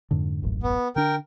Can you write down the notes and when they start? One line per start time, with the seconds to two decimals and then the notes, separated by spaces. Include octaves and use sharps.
0.11 F2 G#2 D3
0.42 D#1 A1 F#2
0.63 B3
0.96 D3 D4 A#4 G5